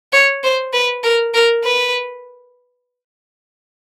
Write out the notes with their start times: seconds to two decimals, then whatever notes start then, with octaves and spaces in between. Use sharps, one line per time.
0.13 C#5
0.43 C5
0.73 B4
1.03 A#4
1.34 A#4
1.64 B4